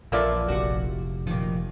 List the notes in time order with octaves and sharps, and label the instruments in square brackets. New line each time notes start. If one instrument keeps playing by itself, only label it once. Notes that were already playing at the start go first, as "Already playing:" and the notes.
[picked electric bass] A#1 [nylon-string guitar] E2 F4 E5 [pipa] A#3 A4 D5
[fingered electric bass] F1 [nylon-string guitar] F#4 G4 F#5
[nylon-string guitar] A#2 D#3 [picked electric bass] F3